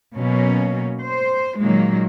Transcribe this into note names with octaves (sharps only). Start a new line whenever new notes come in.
B2 F#3 A#3 C#4
C5
A#2 D#3 F#3 G#3 A#3